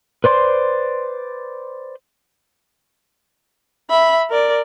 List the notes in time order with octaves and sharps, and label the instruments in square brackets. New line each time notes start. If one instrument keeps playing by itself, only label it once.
[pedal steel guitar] B4 C5 D5 C6
[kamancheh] E5 B5
A#4 D5